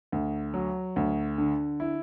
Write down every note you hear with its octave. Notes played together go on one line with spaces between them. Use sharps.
D2
F#3
D2
D3
E4